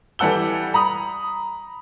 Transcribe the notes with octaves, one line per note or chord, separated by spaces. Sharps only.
E3 G3 A4 F#5 E6 G7
A#5 B5 D#6